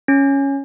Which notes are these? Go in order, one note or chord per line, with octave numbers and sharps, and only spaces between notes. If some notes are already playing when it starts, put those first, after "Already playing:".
C#4